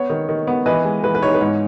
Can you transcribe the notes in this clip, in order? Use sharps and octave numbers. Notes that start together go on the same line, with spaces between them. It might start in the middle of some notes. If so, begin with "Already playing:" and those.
Already playing: B3 C#5
D#3
D#3
B3
E3 B4 D#5
G#3
E3 B4
B4
D#4 C#5
B4
G#2 C#5